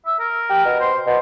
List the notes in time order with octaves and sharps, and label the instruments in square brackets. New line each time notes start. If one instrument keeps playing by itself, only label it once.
[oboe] E5
A#4
[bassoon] G4
B2
[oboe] C5
[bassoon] B2 [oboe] C5